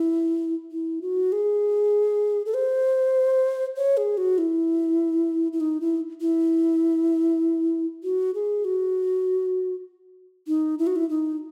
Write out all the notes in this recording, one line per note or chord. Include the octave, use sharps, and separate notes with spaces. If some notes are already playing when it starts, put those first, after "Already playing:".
Already playing: E4
E4
F#4
G#4
A4
C5
C#5
G#4
F#4
E4
E4
D#4
E4
E4
F#4
G#4
F#4
D#4
E4
F#4
E4
D#4